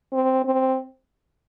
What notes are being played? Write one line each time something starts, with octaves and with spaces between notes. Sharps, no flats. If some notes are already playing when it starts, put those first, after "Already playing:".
C4
C4